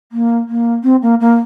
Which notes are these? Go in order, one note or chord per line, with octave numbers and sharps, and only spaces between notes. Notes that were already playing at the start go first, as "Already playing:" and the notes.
A#3
A#3
C4
A#3
A#3